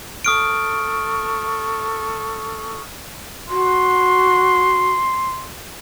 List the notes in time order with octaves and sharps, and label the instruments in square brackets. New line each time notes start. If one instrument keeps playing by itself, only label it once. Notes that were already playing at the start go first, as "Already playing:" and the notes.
[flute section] A4 C#6 [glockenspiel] D#6 F6 D7
[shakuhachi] F#4 [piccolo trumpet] C6